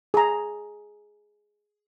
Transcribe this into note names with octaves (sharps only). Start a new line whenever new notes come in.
G#4 A#5